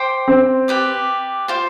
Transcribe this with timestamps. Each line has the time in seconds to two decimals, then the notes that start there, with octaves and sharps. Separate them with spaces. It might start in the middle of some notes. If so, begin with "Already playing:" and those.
Already playing: C5 G5 D6
0.28 C4
0.68 G4 B4 D5
1.48 F4 C5 G5